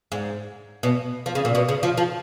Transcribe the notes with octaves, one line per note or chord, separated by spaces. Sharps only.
G#2
B2
F3
C#3
A#2
B2
C#3
F3
F3